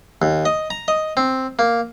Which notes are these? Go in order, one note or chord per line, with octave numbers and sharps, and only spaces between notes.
D#2
D#5
A#5
D#5
C4
A#3